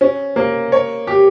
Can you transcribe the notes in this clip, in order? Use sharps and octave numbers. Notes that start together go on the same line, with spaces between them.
C#4
A#3
C#5
G4